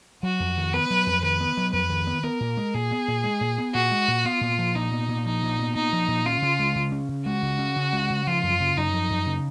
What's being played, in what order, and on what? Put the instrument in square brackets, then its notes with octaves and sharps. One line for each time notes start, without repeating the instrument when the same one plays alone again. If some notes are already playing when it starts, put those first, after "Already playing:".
[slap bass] F#3 [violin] F#4
[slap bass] F2
D#3
[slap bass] B3 [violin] B4
[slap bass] F#3
F2
[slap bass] D#3 [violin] B4
[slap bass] B3
F#3
[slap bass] F2 [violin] B4
[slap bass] D#3
B3
[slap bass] B3 [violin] A#4
[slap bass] A#2
G#3
[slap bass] A#2 [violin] G#4
[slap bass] B3
A#2
G#3
A#2
B3
[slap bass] A#2 [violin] F#4
[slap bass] G#3
A#2
[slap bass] B3 [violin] F4
[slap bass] A#2
F3
[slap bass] A#2 [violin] D#4
[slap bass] B3
A#2
[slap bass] F3 [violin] D#4
[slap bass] A#2
B3
[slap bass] A#2 [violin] D#4
[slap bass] F3
A#2
[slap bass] C#4 [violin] F4
[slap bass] C#3
G#3
C#3
C#4
C#3
[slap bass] G#3 [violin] F#4
[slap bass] C#3
C#4
C#3
G#3
C#3
[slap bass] F3 [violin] F4
[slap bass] F#2
C#3
[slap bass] F#2 [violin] D#4
[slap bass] F3
F#2
C#3